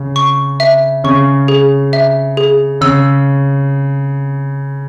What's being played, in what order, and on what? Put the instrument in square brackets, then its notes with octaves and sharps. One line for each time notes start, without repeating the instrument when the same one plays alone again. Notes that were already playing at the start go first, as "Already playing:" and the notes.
Already playing: [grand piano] C#3
[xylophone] C#6
E5
[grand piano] C#3 [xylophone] C#6
[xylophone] G#4
E5
G#4
[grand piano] C#3 [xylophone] E6